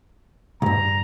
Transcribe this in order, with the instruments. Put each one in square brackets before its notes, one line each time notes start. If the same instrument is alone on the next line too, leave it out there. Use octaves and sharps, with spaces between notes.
[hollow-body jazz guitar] C2 G2 [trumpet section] A#5